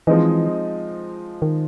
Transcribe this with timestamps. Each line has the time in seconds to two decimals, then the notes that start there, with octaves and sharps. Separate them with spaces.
0.07 E3 F3 G#3 C4 D#4
1.42 D#3